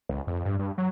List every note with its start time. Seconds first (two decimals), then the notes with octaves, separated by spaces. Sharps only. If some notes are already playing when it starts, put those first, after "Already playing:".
0.09 C#2
0.27 F2
0.45 G2
0.59 G2
0.78 F#3